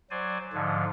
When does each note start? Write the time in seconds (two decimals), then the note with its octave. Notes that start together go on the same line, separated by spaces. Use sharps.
0.10 F#3 C5 D5 G#5
0.53 G#2 D3 F3